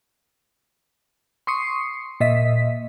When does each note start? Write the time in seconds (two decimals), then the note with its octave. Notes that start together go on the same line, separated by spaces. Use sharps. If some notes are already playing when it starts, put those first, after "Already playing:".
1.47 C6 C#6 D#6 C7 C#7
2.20 A#2 D#5 E5 B6